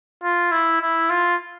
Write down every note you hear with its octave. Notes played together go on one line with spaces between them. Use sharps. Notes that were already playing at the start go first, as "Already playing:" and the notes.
F4
E4
E4
F4